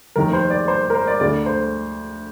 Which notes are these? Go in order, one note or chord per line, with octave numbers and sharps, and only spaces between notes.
F1 D#2 D#3 A#4
C5
D5
C5
A#4
C5
D5
D2 D3 A3 D5
C5